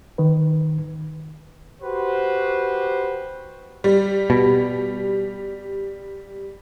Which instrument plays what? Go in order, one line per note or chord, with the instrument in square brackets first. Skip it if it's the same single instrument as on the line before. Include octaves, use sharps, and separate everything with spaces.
[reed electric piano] D#3 B4
[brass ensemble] F#4 G4 B4 C5
[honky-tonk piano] G3
[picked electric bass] B2